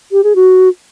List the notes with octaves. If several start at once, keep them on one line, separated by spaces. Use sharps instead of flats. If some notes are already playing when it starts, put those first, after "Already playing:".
G4
G#4
F#4